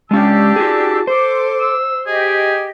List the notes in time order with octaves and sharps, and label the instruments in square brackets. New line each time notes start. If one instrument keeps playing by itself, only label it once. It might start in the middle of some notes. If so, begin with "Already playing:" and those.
[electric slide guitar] G#3 C#4 [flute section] D4 G4 E6 [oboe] A5
[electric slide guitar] F#4 G#4
[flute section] A4 C6 D6 [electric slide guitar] C5
[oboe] E6
[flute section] G4 D#5 [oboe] G#4